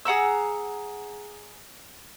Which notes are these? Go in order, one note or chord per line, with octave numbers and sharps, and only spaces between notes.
G#4 F#5 A#5 E6